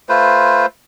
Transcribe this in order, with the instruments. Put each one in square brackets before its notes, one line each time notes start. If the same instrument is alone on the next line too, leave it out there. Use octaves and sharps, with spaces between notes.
[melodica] A3 F4 B4 C5